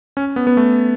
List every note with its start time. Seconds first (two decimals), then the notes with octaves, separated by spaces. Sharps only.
0.17 C#4
0.36 B3
0.47 B3
0.57 A3